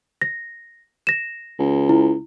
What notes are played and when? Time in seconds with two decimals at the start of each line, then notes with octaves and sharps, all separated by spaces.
0.22 A#6
1.07 A#6 E7
1.59 C#2
1.89 E4